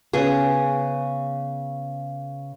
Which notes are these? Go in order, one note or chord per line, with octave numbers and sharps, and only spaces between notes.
C#3 B3 G#4